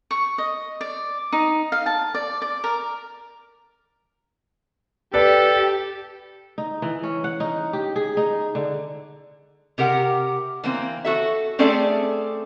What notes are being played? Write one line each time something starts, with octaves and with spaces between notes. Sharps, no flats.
C#6
D#5
D5
D#4
F5
A5
D5
D5
A#4
G4 A4 B4 D5
D#4
E3
C#4
F#5
D#4
G4
G#4
D#4
D3
C3 G4 A#4 F#5
E3 A#3 C4
F#4 A4 E5
A3 C4 C#4 G#4 A4 D5